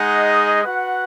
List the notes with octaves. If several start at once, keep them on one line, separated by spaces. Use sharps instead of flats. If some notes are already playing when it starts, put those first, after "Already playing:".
Already playing: G#3 D#4 G#4 D#5 F#5
F#4 B4 F#5